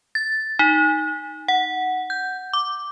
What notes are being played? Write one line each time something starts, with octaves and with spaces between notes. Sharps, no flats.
A6
D#4
F#5
G6
D6